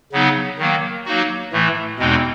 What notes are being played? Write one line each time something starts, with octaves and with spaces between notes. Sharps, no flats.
C#3 F#3 B3 D#4
D#3 F#3 A#3
F#3 A#3 D#4 F#4
A2 E3 A3
E2 B2 G#3 C4 D#4